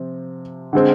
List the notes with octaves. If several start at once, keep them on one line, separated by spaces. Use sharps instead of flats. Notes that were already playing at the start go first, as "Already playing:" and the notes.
Already playing: C3 F3 C4
D3 G#3 C4